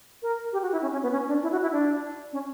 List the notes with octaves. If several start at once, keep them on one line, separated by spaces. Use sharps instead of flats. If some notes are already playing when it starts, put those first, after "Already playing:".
A#4
G4
F#4
E4
C#4
C#4
B3
C#4
D4
E4
F#4
E4
D4
C#4